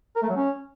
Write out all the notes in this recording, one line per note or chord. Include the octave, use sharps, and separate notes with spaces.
A#4
A3
F#3
C#4